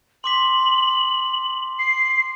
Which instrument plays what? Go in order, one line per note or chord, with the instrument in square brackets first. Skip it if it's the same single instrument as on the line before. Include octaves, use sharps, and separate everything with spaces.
[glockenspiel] C6 D6 B6 [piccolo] F#7
[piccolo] C7